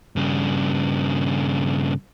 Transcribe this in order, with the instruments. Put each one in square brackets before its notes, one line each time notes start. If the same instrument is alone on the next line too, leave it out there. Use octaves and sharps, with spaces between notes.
[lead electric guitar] G2 C#3